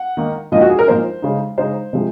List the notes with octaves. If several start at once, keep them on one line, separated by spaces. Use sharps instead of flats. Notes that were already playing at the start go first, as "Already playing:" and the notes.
Already playing: F#5
D#3 A#3 D#4
A#2 F3 A#3 D#4 D#5
F#4
G#4
A#4
A#2 F3 A#3 D#4 C5
C#3 G#3 D#4
C#3 G#3 D#4 C5
C3 F3 G#3